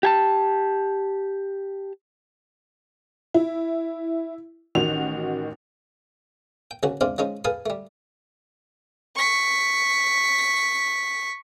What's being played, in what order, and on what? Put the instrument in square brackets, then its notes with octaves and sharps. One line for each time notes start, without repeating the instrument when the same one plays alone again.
[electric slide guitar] G4 G#5 A5
[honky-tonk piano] E4
A1 D#3 F#4 F7
[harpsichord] G5
A#1 C#3 F#3 F#4
G#2 C3 C4 D4 C5 F5
F3 G#3 C#4 D#4
G#4 A4 B4 F5 G#5 A5
G3 A3
[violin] C#6 B6